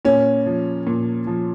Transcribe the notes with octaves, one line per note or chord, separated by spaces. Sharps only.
A#2 C#4
F3
A#2
F3